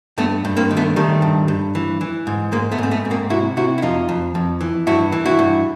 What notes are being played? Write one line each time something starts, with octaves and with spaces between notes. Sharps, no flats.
G2 A3 B3
G2
A#3 C4
D#3
A3 B3
D#3 G3 A3
G2
G2
E3
E3
G#2
G#2 G#3 A#3
A3 B3
G#2 C4
A3 B3
G#2
A#3 C4
C3 E4 F#4
C3 E4 F#4
E4
F2 D#4 F4
F2
F2
E3
G2 E4 F#4
E3
E4 F#4
G2